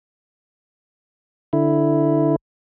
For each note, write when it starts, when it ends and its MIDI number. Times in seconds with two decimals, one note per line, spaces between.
1.53 2.36 50
1.53 2.36 64